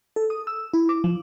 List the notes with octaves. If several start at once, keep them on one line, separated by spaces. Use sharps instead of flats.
A4
D#6
E6
E4
D6
F3